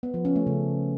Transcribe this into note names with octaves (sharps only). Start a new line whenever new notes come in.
B3
F3
C#4
A3
C#3